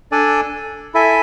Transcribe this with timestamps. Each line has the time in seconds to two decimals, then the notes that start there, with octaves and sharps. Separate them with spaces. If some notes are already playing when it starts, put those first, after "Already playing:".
0.12 D4 A4 D5 G#5
0.94 E4 A4 E5 G#5